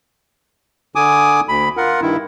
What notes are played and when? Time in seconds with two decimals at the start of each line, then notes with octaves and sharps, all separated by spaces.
0.95 D3 G#5 D6 D#6
1.48 D2 B5
1.77 F4 A#4 F#5
2.02 G2 D#3 E4